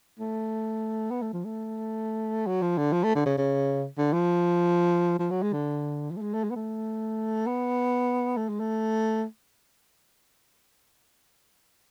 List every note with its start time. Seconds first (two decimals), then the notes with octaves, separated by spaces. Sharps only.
0.20 A3
1.11 B3
1.22 A3
1.33 F3
1.45 A3
2.47 F#3
2.62 F3
2.78 D3
2.93 F3
3.04 A3
3.16 D3
3.26 C#3
3.38 C#3
3.98 D3
4.14 F3
5.19 F3
5.31 F#3
5.43 G#3
5.53 D3
6.11 F3
6.17 A3
6.22 G#3
6.34 A3
6.44 G#3
6.51 B3
6.56 A3
7.47 B3
8.37 A3
8.49 G#3
8.60 A3